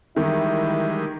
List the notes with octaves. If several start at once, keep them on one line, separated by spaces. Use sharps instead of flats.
D#3 E3 G3 G#3 E4